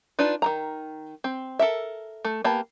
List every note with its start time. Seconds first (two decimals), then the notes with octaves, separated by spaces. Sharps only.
0.19 D4 D#4 F4 B4
0.42 D#3 F3 A#5
1.24 C4
1.59 A4 A#4 E5
2.25 A3
2.44 A#3 B3 G4 A5 B5